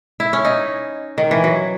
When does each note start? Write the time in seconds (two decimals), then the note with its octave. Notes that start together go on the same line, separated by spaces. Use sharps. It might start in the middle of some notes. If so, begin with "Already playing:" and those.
0.20 E4
0.33 C#4
0.45 D#4
1.18 D#3
1.31 E3
1.44 F#3